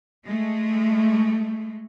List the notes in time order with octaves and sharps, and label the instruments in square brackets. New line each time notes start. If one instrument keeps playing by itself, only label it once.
[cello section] G#3 A3